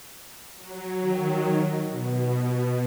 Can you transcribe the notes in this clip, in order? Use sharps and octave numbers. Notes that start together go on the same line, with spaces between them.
F#3
D#3
B2
B2